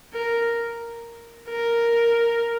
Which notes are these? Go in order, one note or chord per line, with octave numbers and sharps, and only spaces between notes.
A#4
A#4